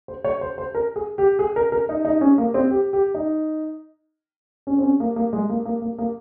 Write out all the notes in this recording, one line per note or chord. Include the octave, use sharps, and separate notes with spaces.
C5
C#5
C5
C5
A#4
G#4
G4
G#4
A#4
A#4
D#4
D#4
C#4
A#3
C4
G4
G4
D#4
C#4
C4
C#4
A#3
A#3
G#3
A#3
A#3
A#3
A#3